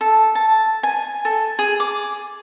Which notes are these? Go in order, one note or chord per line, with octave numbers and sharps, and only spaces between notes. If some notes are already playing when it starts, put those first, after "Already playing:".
A4
A5
G#5
A4
G#4
D6